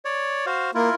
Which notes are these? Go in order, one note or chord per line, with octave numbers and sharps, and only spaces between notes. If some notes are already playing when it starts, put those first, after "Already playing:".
C#5 D5
F#4 C5 F5
A#3 E4 F4 A#4